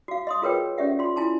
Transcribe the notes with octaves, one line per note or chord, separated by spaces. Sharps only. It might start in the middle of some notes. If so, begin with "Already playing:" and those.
F#4 F5
D#5 C6 D#6
F4 G#4 A#4 B4 C#5 G5
C#4 G4 D5 E5 F#5
F4 C6
E4 F4 G#5 A5 C6